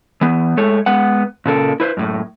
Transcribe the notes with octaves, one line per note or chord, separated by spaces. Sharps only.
E3 B3
G#3 A3 A4 C#5
G#3 B3 F#5
A#2 C#3 A4 A#4
E4 B4 C5
F#2 A2